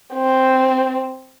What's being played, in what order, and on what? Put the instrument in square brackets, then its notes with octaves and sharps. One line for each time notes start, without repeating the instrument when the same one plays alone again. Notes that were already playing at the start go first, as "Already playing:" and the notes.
[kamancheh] C4